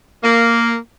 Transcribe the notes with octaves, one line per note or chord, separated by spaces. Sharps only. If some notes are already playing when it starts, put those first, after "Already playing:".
A#3